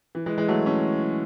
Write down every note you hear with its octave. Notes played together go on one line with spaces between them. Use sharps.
E3
E3 G#3
E3 G#3
F#3 A3
A3 C#4